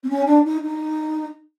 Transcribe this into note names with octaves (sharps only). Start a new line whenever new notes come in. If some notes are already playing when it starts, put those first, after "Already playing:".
C4
C#4
D4
D#4
D#4